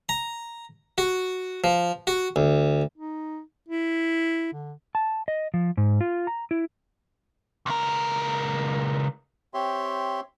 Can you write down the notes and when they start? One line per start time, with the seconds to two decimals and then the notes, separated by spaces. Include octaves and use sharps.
0.09 A#5
0.98 F#4
1.64 F3
2.07 F#4
2.36 D2
2.96 D#4
3.69 E4
4.54 D3
4.95 A5
5.28 D#5
5.54 F3
5.77 G#2
6.01 F4
6.27 A#5
6.51 E4
7.66 C#2 A#4
9.54 C4 G4 C#5 E5 C6